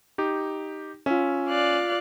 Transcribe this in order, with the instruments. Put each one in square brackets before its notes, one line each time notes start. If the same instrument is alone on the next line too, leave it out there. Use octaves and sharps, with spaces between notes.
[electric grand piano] D#4 G4
[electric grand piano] C#4 [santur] F4 E5
[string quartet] D5 F5 F#6